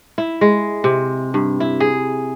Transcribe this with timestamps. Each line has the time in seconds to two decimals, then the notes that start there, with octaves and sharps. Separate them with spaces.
0.18 E4
0.41 G#3
0.84 C3
1.34 G2
1.60 E4
1.80 G#4